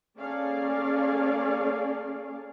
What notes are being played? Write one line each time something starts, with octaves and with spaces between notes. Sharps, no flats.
A#3 C#4 G#4 A4 D5 F5